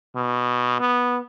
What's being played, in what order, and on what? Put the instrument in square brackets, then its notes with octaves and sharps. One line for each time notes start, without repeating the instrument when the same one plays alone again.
[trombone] B2
B3